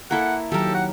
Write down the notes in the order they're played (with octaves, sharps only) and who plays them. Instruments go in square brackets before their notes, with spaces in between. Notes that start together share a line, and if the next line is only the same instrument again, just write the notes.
[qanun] A#3 E4 A4 [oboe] F#5
[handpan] D#3 F#3 [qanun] G4 A#4 [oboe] A4
[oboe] F#5